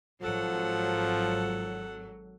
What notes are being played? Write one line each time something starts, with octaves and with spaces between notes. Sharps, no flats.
G#1 F3 F#3 A4 F#5